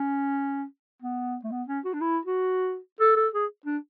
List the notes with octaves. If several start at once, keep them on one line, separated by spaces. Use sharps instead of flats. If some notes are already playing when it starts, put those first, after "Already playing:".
Already playing: C#4
B3
A3
B3
C#4
F#4
D4
E4
F#4
A4
A4
G#4
D4